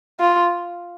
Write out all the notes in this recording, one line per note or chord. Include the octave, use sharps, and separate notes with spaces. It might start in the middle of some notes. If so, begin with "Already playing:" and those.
F4